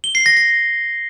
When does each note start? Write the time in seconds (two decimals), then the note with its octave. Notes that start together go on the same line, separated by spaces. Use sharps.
0.04 G7
0.15 C7
0.26 A#6
0.37 A#6